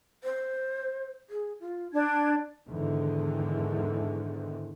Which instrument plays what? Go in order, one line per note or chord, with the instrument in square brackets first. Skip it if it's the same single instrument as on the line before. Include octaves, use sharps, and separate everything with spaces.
[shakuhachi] C5
G#4
F4
[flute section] D4 G#6 [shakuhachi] A5
[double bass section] E2 G#2 D3 D#3